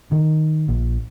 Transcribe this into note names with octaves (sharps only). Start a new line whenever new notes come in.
D#3
A#1